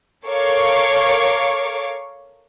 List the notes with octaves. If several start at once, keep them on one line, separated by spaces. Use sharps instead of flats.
A4 A#4 C#5 F5 C#6 D6